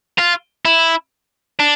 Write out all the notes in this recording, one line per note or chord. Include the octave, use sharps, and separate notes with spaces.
F4
E4
D4